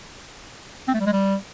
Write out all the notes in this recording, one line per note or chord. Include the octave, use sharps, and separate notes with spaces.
C4
A3
G3
G#3
G3